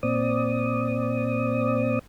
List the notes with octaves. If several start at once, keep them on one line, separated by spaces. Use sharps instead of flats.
A#2 C4 D5 D#6